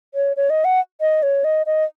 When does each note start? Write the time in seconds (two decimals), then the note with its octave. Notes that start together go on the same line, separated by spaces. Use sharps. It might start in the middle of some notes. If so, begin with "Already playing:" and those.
0.14 C#5
0.37 C#5
0.50 D#5
0.65 F#5
1.01 D#5
1.23 C#5
1.44 D#5
1.66 D#5